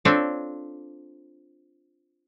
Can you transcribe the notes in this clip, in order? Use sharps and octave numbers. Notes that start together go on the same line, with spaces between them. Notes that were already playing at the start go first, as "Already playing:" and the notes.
C4 D4 F4 A4 C#5